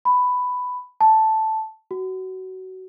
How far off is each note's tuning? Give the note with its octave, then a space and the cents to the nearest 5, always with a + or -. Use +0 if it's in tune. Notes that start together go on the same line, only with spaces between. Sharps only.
B5 +10
A5 +0
F#4 +20